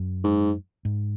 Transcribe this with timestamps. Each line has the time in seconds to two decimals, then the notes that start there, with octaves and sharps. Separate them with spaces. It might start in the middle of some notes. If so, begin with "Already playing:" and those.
Already playing: F#2
0.24 G#2
0.85 G#2